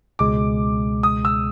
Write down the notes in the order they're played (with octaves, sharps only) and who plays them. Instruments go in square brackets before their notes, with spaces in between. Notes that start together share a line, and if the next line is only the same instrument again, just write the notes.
[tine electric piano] C#2 B2 G#3 [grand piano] D6
[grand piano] D#6
E6